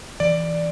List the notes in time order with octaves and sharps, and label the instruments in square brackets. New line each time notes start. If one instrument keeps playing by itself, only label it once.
[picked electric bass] E3 [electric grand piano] D5